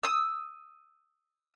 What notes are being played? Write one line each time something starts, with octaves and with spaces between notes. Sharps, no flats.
D#6 E6